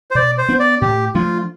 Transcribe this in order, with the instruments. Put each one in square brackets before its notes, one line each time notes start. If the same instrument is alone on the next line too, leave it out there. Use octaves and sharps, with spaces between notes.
[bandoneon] C5
[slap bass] B2 [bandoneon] D5
[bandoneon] C5
[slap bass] B3 D4
[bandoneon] D5
[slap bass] A2 [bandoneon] G4
[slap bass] F3 A3 D4 [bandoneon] F4